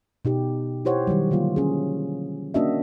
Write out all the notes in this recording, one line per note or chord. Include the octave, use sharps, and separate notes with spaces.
B2 D#4 G4
E4 G4 C5 C#5 F#5
D#3 F#3 G3
D3 F#3 A#3 F4
C#4 G#4
A#3 C#4 D4 F#4 D#5 E5